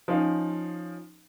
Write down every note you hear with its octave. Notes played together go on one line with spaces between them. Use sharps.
F3 C#4 D#4 D#5 F5